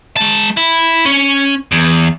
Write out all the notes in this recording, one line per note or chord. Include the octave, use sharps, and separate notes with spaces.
G#3 A5
E4
C#4
E2